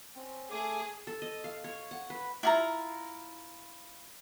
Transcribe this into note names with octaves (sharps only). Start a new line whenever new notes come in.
C4 C#4
A3 G#4 G#5 D6
A4
D#5
F5
C#5
F#5
B4
E4 F4 A#5